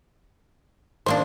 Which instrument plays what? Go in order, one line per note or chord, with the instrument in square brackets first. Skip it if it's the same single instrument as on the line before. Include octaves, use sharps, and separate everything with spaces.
[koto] D#3 A#3 D4 [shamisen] C5